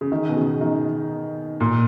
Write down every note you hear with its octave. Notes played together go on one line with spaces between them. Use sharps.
C#3
D#3
B2
C#3
D#3
A#2